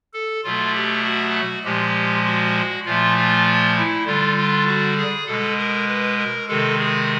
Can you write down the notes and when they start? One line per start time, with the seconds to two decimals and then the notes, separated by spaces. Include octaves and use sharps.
0.14 A4
0.44 B2 F#3 A3 F4
0.75 G4
1.05 F#4
1.64 A#2 F3 G#3 G4
2.26 F#4
2.85 A#2 F3 A3 F4
3.17 F4
3.76 E4
4.06 D3 G3 F4
4.37 F4
4.67 F#4
4.97 G#4
5.27 B2 G#3 A4
5.58 A#4
5.88 B4
6.18 A#4
6.48 C3 D#3 G#3 A4
6.78 G#4